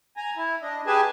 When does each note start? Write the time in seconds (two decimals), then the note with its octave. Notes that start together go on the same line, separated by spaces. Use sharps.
0.17 G#5 A#5
0.37 E4
0.63 D4 D#5
0.87 G4 G#4 B4 G#5 A5